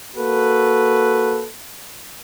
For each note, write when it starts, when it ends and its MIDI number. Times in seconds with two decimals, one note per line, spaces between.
0.17 1.46 58
0.17 1.46 66
0.17 1.46 69
0.17 1.46 71